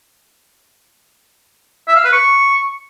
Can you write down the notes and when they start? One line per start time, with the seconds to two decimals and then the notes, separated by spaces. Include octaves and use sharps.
1.88 E5
1.96 F5
2.04 B4
2.12 C#6